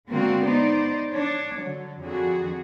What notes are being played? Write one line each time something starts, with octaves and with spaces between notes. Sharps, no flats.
D3 G#3 A#3 C4 F4 F#4
B3 D#4 C5 D5
D4 C#5
D3 F#3
F2 D3 F#4 G#4